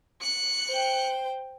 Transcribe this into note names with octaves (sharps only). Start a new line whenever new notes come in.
F#6 C#7
C5 G5